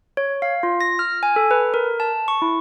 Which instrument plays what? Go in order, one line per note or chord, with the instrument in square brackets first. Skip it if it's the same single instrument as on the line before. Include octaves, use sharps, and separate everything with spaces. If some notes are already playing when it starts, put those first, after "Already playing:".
[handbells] C#5
F5
F4
A#6
F6
G#5
A4
B4
A#4
A5
C#6
E4